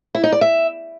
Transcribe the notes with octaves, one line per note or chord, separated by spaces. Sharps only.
E4
D#4
D5
E5